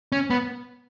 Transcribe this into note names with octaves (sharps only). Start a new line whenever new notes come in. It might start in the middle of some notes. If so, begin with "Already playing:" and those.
C#4
B3